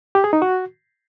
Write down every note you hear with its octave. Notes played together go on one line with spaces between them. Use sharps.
G4
G#4
D#4
F#4